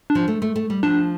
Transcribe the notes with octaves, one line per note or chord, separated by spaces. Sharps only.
D4
F3
A3
A3
A3
G3
F3 D4